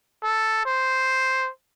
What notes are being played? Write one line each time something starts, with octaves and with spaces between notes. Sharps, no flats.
A4
C5